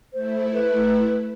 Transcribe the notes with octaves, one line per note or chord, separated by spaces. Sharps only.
A3 E4 C5
B4